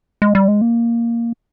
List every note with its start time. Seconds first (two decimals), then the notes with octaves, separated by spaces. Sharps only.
0.22 G#3
0.35 G3
0.48 G#3
0.61 A#3